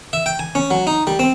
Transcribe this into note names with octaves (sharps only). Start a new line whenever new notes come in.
E5
G5
G#5
C#4
F#3
D#4
G3
C4